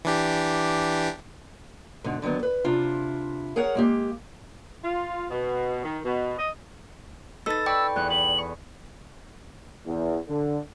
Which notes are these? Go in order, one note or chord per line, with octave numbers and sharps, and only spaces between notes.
E3 D4 G4
G#2 B2 D3
D3 D#3 F#3 B3
B4
C3 D4 E4 F4
G#4 A#4 C#5 F#5
G#3 A#3 G4
F4
B2
D#3
B2
D#5
D#4 A4 B4 E6 A6
D5 G5 B5 C#6 E6
E2 F#6
B4 F#7
C#6
E2
D3